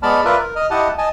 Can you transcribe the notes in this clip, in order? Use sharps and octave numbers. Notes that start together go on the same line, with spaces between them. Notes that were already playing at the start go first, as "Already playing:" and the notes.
G#3 B3 D5 A5 B5 F6
F4 A#4 B4 D5 E5
A#4
D#5 F6
E4 G4 D#5 F#5 A5
D#5 G#5 A5